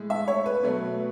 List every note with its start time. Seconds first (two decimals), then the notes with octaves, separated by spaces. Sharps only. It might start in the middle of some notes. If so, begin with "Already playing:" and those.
Already playing: A2 G#3
0.10 E5
0.28 C#5
0.46 B4
0.63 B2 F#3 A3